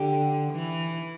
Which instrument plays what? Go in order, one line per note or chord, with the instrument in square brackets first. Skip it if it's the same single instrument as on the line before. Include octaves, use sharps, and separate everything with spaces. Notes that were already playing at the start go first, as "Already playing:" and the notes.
Already playing: [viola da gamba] D3 [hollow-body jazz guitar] G4
[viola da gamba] E3